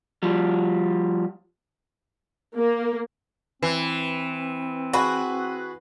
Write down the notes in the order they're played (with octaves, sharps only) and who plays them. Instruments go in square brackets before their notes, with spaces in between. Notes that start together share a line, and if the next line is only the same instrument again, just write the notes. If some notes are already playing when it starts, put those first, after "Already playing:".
[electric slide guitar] F3 G3
[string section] A#3
[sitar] E3 [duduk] C4 [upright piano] C7
[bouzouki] F#4 [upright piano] G#4 B4 B5